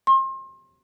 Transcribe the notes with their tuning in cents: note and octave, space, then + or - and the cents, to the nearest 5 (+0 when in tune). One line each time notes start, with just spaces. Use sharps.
C6 +35